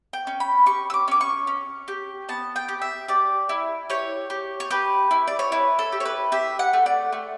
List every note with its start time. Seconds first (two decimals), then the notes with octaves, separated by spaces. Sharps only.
0.13 G5
0.27 C#4
0.40 B5
0.66 G4 C#6
0.90 E6
0.94 D6
1.08 C#4 D6
1.21 C#6
1.47 C#4
1.88 G4
2.29 B3 A5
2.56 G5
2.69 G4
2.82 E5
3.08 G4 D5
3.49 E4
3.90 G4 C#5
4.30 G4
4.60 C#5
4.70 G4 B4
5.11 E4
5.27 D5
5.39 C#5
5.52 E4 B4
5.79 A4
5.92 G4
6.00 C#5
6.05 B4
6.32 G4 E5
6.59 F#5
6.73 A3
6.86 D5
7.12 A3